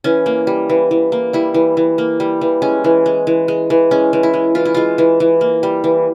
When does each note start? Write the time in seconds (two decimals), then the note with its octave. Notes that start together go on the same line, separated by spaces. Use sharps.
0.04 E3 C#4
0.26 A#3
0.47 G3
0.69 E3
0.91 E3
1.12 A#3
1.33 G3 E4
1.54 E3
1.77 E3
1.98 A#3
2.20 G3
2.41 E3
2.62 G#3 C#4
2.84 E3
3.06 G#3
3.27 E3
3.48 G#3
3.70 E3
3.91 G#3 C#4
4.13 E3
4.23 E4
4.34 G#3
4.55 E3 F4
4.65 E4
4.74 G#3 F4
4.98 E3
5.20 E3
5.41 A#3
5.63 G3
5.84 E3